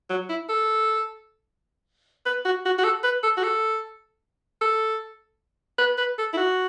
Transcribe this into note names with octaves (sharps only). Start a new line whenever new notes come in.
F#3
E4
A4
B4
F#4
F#4
F#4
A4
B4
A4
F#4
A4
A4
B4
B4
A4
E4
F#4